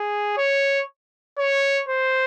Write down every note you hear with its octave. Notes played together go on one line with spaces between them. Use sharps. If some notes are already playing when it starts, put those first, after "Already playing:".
Already playing: G#4
C#5
C#5
C5